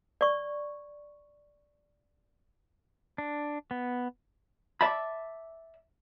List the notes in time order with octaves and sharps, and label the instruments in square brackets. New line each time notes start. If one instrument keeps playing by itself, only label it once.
[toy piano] D5 C#6
[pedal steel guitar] D4
B3
[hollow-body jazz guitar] D5 E5 A5 B5